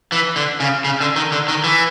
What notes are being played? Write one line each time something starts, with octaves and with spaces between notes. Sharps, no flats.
E3
D3
C#3
C#3
D3
D#3
D3
D#3
E3